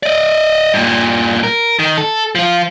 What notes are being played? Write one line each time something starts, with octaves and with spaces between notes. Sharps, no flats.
D5 D#5
G2 A#2
A#4
D#3
A4
F3 F4